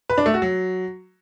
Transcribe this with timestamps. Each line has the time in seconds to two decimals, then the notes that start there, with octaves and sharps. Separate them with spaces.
0.10 B4
0.18 D4
0.26 A3
0.34 F#4
0.42 F#3